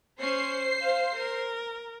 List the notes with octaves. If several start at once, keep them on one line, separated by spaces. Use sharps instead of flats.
C#4 C5 C7
F5
A#4